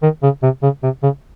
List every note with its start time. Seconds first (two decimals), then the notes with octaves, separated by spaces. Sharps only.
0.03 D#3
0.23 C#3
0.43 C3
0.63 C#3
0.83 C3
1.03 C#3